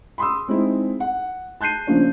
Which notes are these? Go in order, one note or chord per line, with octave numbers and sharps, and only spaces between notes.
B5 C6 D#6 E6
G#3 C4 D#4 E4
F#5
A5 F#6 G6 C7 D#7
C#3 F3 A#3 C#4 D4